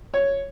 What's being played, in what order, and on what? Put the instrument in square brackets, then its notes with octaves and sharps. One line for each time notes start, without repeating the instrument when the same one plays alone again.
[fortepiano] C#5